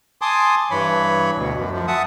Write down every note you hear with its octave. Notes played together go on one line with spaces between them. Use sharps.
G#5 A5 C6 D6 D#6
G2 E3 C#5 B5
D2 B2
F#2
F#2 F3
E5 F#5 A5 D#6